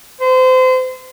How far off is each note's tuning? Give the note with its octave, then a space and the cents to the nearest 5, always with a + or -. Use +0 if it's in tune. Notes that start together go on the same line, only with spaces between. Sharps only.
C5 -30